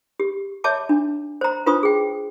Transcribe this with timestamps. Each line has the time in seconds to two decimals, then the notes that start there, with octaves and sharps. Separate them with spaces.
0.20 G4
0.64 C#5 E5 A5 D6
0.89 D4
1.41 C5 A#5
1.66 D4 F4 B4 C5 C6 D#6
1.83 G#4 G5